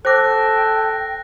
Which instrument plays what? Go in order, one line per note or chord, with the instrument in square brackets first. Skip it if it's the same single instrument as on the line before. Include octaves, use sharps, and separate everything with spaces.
[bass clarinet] A4 [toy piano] C5 D6 [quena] G5 [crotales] F#6 A#6